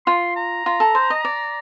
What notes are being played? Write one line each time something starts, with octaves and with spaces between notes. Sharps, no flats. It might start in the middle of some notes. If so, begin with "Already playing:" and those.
F4 C6
A#5
F4
A4
C5
D#5
D5